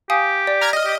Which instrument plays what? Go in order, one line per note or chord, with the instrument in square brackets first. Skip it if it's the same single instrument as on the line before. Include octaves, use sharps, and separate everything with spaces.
[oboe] G4 [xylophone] F5 G#5 D#6
[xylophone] D5
[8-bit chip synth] A#5 F6 G#6
[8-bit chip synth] D#5 [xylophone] F6 A#6
[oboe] G4